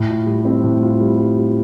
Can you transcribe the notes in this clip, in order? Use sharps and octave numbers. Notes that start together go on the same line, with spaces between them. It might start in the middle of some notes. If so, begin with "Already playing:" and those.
Already playing: A2
F4
G3
C4
A2
F4
G3
G3
F4